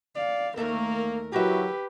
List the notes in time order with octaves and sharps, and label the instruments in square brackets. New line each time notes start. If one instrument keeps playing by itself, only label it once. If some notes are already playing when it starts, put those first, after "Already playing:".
[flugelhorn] D5 [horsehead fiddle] F5
[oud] D#2 A3 E5 [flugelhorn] A#3 [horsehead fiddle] A#4
[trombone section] F#3 E4 F#4 [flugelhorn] G4 [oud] A#4 E5 [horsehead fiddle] B4